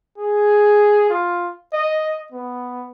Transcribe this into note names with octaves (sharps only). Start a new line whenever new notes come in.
G#4
F4
D#5
B3